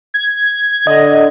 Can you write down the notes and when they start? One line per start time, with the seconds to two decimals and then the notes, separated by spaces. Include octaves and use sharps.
0.14 G#6
0.87 D3 D#5